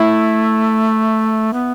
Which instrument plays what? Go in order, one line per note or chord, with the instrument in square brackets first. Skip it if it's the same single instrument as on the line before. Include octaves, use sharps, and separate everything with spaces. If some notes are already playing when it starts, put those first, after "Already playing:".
Already playing: [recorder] A3 [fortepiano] E4
[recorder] B3